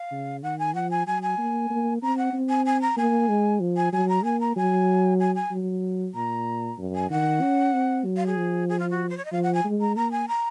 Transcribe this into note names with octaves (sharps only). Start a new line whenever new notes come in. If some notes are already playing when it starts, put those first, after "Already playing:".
Already playing: F5
C#3
D#3 F#5
G#5
F3 F#5
G#5
F#3 G#5
G#5
A#3
A#3
C4 A#5
F#5
C4
G#5
G#5
A#5
A#3 G#5
G#3
F3
G#5
F#3 G#5
A#5
A#3 G#5
A#5
F#3 G#5
G#5
G#5
F#3
A#2 A#5
F#2
G#5
D#3 F#5
C#4
C4
F#3
F5
G#4
F3
G#4
F4
F#4
C5
C#5
D#5
F3 F5
F#5
G#5
G#3
A#5
A#3 A#5
G#5
A#5